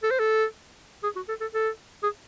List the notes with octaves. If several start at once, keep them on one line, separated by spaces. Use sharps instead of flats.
A4
C5
A4
G#4
F#4
A4
A4
A4
G#4